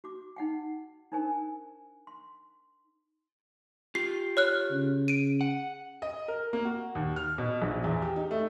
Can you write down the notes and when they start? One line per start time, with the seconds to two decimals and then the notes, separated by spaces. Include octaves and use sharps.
0.04 F#4 D6
0.36 D#4 F#5 G5
1.12 D4 D#4 A#4 C5 G#5
2.07 C6
3.95 F4 G4 C7
4.37 C#5 F6 F#6
4.71 C#3
5.08 D7 D#7
5.41 F#5
6.02 D#5
6.28 A#4
6.53 A#3
6.65 F#4
6.95 D#2
7.16 F6
7.38 B2
7.62 A#1
7.84 E2
8.02 G4
8.16 D#4
8.31 A3